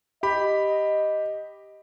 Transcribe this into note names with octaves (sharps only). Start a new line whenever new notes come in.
G4 D#5 B5